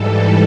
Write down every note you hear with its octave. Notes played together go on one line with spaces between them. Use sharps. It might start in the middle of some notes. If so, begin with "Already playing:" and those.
Already playing: G#2 E3 G3 A4